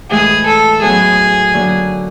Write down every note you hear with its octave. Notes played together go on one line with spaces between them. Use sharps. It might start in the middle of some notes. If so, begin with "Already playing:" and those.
A2 E3 G#3 G#4
A4
A2 F#3 B3 D#4 G#4
D3 F#3 A#3